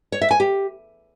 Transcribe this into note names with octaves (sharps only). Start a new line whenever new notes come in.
C#5
E5
G#5
G4